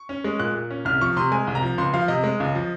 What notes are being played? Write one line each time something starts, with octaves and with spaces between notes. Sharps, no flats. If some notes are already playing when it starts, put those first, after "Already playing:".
Already playing: C#6
C#4
G#3
A#2 F#6
A#2
C#4
C2 F6
F3 C#6
C3 C6
G#3 G#5
C2
A#5
F3
C#2 C6
F3 F5
C3 D#5
G#3
C#2
F3